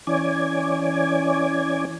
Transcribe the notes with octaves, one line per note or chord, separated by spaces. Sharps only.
E3 C#4 D5 G#5